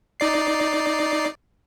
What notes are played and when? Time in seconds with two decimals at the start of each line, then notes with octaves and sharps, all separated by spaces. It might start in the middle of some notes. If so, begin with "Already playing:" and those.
0.20 D#4 D5 C7